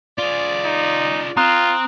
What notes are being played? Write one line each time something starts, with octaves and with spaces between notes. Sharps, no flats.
F4 G#4 D5
D#4
C4 F4 A#5 D#6 F#6